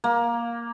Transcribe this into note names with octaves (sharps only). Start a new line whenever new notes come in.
A#3